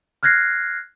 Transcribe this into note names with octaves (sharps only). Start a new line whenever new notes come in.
F6 F#6 G#6 A#6 C7